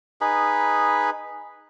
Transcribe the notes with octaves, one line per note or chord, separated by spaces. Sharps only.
D#4 G#4 B4 B5